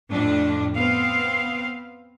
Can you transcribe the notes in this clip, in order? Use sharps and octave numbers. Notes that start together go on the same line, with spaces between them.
F2 A2 D4
B3 C4 F5